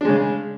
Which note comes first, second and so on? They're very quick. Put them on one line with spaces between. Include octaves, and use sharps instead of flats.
D4 G#3 C#3